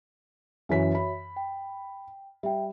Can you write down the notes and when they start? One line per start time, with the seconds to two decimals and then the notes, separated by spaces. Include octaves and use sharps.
0.69 F#2 E3 F#4 C#5 E5 B6
0.95 B5
1.36 G5
2.43 G3 E5 G5